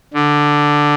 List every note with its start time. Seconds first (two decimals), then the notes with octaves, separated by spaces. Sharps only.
0.13 D3